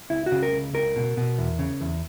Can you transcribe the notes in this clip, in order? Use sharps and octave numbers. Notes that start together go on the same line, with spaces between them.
C#2 E4
F#4
C#3
A#4
C#2
C#2 A#4
B2
B2
E2
C#3
E2